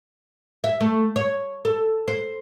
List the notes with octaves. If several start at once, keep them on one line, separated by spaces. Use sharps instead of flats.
E5
A3
C#5
A4
C5